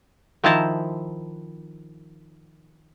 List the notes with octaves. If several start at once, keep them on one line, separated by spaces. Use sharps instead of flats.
D#3 F3 E4 C5 A5 A#5